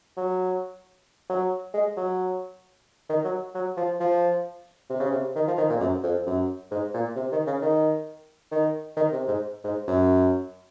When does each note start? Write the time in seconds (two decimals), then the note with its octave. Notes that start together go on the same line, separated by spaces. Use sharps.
0.17 F#3
1.30 F#3
1.74 G#3
1.97 F#3
3.09 D#3
3.24 F#3
3.55 F#3
3.77 F3
4.00 F3
4.90 C3
5.00 C#3
5.11 C3
5.36 D#3
5.47 F3
5.57 D#3
5.70 A#2
5.76 F2
5.80 F#2
6.03 F2
6.26 F#2
6.71 G#2
6.94 A#2
7.15 C3
7.32 D#3
7.46 C#3
7.62 D#3
8.52 D#3
8.97 D#3
9.12 C3
9.27 G#2
9.64 G#2
9.88 F#2